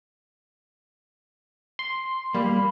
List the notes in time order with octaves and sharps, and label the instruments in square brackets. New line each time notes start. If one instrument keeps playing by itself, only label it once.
[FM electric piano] C6
[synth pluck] G3 [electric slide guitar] A#3 [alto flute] B5